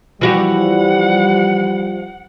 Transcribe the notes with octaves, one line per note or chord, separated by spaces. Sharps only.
E3 F3 G3 F#4 G4 F#5